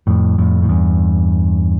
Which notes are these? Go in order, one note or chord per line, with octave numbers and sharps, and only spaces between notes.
F2 A2
F2 A2
A2
E2 G2